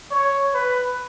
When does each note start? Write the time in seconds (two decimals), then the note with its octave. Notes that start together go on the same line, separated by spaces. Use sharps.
0.11 C#5
0.54 B4